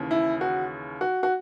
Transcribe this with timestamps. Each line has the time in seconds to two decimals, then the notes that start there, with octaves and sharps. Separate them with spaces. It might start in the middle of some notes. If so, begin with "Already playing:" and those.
Already playing: D#2 C#3 E3
0.11 E4
0.41 F#4
1.01 F#4
1.23 F#4